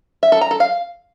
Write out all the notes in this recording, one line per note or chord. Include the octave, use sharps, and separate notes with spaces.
E5
A4
A#5
A4
F5